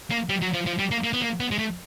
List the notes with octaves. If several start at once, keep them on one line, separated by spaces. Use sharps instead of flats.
A#3
G3
F#3
F3
F3
G3
A#3
A#3
B3
A#3
B3
G#3
A3